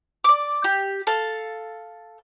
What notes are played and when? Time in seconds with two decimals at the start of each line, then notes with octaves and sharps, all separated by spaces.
0.24 D5 D6
0.64 G4
1.07 A4 F5 A5